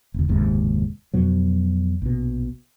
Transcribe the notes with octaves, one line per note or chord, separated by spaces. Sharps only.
E1 D2
F#1 D#2 G#2 C3
F2 B2 F#3
A#1 B2